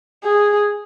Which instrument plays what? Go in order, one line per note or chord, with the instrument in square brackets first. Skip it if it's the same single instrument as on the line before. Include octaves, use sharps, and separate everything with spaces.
[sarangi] G#4